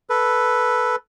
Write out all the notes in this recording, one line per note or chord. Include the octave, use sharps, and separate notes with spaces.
A4 B4